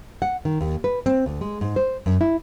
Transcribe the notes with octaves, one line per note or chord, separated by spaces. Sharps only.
F#5
D#3
D#2
B4
C4
D2
G#3
G#2
C5
F#2
E4